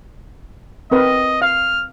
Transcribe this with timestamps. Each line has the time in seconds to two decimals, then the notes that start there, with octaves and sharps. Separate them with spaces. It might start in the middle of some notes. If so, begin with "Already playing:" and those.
0.91 C4 A#4 B4 D#5
1.42 F5 F6